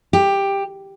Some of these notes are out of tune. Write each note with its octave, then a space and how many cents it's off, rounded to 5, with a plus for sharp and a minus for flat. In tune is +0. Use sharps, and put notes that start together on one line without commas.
G4 +10